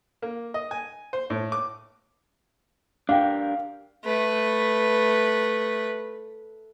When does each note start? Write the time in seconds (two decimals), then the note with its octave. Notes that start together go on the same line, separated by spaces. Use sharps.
0.22 A#3
0.54 D#5
0.71 G#5
1.13 C5
1.30 A2
1.52 D6
3.09 D4 G4 A#4 F5 G5
4.04 A3 B4